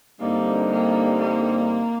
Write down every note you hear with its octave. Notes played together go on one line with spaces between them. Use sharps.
G2 D3 G3 A#3 C4 D#4
A#3
A#3